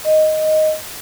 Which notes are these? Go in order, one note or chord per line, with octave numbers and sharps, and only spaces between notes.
D#5